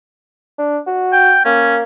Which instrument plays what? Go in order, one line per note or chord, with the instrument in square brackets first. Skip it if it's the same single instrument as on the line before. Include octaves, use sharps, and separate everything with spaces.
[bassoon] D4
F#4
[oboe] G5
[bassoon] A#3 [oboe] C#4